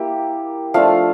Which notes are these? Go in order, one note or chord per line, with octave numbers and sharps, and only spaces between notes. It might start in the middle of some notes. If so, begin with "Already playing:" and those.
Already playing: A#3 E4 G4
F3 A3 D4 F4 F5